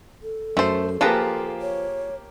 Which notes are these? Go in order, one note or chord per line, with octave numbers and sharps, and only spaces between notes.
A4
F#2 A3 C5
F3 A#3 F4 G4 G#4 B4 A5 A#5
C#5